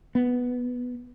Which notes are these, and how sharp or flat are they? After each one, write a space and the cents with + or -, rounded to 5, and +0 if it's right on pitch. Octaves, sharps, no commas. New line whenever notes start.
B3 +0